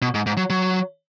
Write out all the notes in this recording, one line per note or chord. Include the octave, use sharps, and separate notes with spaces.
B2
G#2
G#2
F#3
F#3